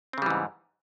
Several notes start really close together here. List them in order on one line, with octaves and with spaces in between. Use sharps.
C4 C#3 G3 E3 G#2